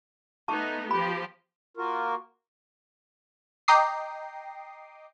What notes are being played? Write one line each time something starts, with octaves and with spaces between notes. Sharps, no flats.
A3 B3 D#4 A5 C#6 D6
F3 G4 B5
A#3 F4 F#4 A#4
D#5 G5 A#5 D6 D#6 C7